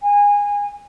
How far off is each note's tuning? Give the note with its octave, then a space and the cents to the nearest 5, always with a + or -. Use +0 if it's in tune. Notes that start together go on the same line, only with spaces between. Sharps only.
G#5 -25